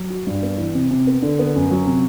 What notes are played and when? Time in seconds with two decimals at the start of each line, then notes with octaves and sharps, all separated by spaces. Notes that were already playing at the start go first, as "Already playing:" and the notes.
Already playing: F#3
0.10 F#4
0.27 G2
0.43 B3
0.58 E3
0.75 C3
0.91 C3
1.07 B3
1.22 D3
1.39 B3
1.55 F#2
1.71 F#3
1.87 C3